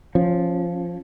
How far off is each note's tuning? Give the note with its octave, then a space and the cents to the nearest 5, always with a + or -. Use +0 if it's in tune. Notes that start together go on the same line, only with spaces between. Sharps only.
F3 +0 C#4 -20